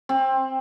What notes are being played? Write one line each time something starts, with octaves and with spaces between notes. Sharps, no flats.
C4